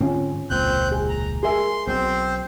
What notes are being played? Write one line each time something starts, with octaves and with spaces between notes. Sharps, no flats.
G#2 D3 C4 C#4 F4
E1 C#2 A#2 C4 F#6 G6
G#4
A#5
G#4 A#4 E5 C6
B1 B2 C4 C5